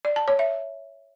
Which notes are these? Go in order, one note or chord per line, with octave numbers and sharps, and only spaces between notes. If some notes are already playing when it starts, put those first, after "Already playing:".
D5
A5
C#5
E5